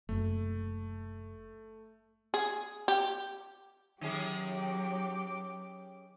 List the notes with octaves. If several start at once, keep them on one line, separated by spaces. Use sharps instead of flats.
F#1 C2 F#2 A3
G#4
G4
D#3 F#3 C#4 G4 G#4 D6